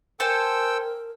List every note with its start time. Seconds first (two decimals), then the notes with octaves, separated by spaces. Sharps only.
0.20 A4 A#4 C5 G5 G#5 E6